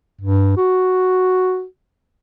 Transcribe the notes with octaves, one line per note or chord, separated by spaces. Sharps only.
G2
F#4